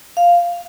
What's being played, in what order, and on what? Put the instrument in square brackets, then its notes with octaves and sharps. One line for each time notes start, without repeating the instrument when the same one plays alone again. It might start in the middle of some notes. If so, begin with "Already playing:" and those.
[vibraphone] F5